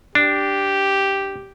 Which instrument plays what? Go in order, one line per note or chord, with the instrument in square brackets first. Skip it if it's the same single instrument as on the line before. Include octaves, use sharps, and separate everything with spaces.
[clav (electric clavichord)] D4 [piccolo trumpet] G4